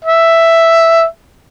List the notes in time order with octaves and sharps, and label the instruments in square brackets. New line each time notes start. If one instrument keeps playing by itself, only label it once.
[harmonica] E5